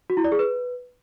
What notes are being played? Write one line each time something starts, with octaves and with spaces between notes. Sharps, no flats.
F#4
E4
D5
G#4
B4